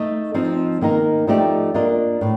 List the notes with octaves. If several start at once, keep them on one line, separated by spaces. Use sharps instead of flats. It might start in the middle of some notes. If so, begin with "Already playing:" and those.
Already playing: A3 D#4 A4 D#5
F3 C4 D#4
D#3 A#3 D#4 A#4
F3 A3 D#4 G4 D5
A#3 D4 F4 A#4 D#5
A2